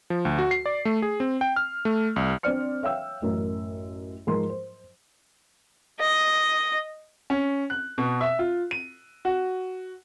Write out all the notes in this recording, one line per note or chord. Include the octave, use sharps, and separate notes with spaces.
F3
D2
F#4
C7
D5
A3
G#4
C4
G5
F6
A3
C2
C4 D4 C5 D5 F6 C#7
C#5 E5 F5 G5 E6
A1 F#2 A#4
G#2 F3 A#4 C6
C5
D#5
C#4
F#6
B2
E5
F4
D#7
F#4